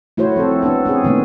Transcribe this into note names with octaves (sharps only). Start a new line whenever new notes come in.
A3 E4 F#4 C5 C#5
F3 C4 A4
B3 D4 A4
C4 C#4 G#4
A#2 D3 D#3 A3 B3 C4